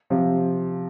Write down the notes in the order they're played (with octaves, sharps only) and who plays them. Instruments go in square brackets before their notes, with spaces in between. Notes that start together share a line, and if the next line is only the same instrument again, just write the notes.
[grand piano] C3 F3